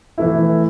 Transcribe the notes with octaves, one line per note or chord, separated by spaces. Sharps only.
E3 A3 E4